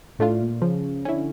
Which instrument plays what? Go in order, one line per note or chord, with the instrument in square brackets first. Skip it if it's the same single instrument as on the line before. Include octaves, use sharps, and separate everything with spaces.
[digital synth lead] A2 [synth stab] A3 D4 F4
[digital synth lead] A#2
[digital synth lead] C#3 [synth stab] F3
[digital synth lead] D3 [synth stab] C#4 E4